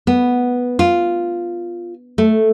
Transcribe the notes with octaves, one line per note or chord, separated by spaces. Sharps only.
B3
F4
A3